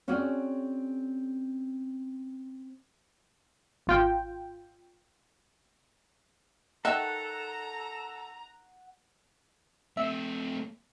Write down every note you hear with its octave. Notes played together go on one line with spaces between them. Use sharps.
C4 C#4 F#4 G#4 D5
G#1 F4 G5
D#3 A4 D#5 E5 F#5 A#5
A3 C4 E5